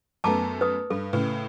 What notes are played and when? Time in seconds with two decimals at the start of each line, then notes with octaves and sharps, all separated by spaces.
0.24 F#2 A3 B3 A5 A#5 D6
0.61 B4 D#6
0.90 G2 A4
1.13 A2 C#3 B4